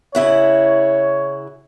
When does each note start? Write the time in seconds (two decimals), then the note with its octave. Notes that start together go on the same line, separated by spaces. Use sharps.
0.15 C#3 E4 C#5 F#5